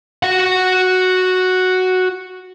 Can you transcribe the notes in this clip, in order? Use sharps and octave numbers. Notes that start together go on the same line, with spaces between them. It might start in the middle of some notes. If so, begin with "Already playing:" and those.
F#4 F#5